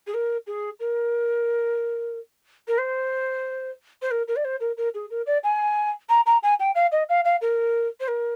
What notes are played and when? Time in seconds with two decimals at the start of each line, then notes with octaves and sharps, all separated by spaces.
0.07 G#4
0.14 A#4
0.47 G#4
0.79 A#4
2.67 A#4
2.78 C5
4.02 C5
4.11 A#4
4.28 A#4
4.36 D5
4.44 C5
4.60 A#4
4.77 A#4
4.94 G#4
5.10 A#4
5.26 D5
5.43 G#5
6.09 A#5
6.26 A#5
6.43 G#5
6.59 G5
6.75 F5
6.92 D#5
7.09 F5
7.25 F5
7.41 A#4
8.00 C5
8.08 A#4